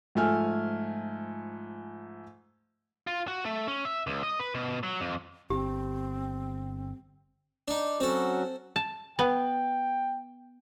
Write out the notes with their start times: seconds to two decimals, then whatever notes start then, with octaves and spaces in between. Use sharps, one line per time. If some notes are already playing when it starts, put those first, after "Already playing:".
0.15 G#2 F3 A3 G#5 F6
3.07 F4
3.28 F#4
3.45 A3
3.68 C#4
3.85 E5
4.07 C#2
4.23 D#5
4.40 B4
4.55 B2
4.83 F#3
5.01 F2
5.50 G1 C4 G4
7.68 D4 D#4
8.00 F#3 C4 C#4 F#4 A4
8.76 A5
9.19 B3 G5